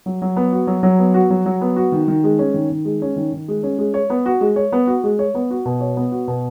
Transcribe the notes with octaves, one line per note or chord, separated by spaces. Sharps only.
F#3
F#3
B3
F#4
F#3
F#3
B3
F#4
F#3
F#3
B3
F#4
D#3
D#3
G#3
C#4
D#3
D#3
G#3
C#4
D#3
D#3
G#3
C#4
G#3
C#5
B3
F#4
G#3
C#5
B3
F#4
G#3
C#5
B3
F#4
B2
C#5
B3
F#4
B2